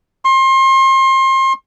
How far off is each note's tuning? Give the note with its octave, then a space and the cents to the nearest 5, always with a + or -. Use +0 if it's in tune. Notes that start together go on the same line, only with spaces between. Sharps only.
C6 +35